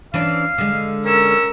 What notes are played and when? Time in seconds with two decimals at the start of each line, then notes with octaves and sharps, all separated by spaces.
0.14 E3 C#4 D4 F5
0.58 D3 G#3
1.05 C#4 A#4 E6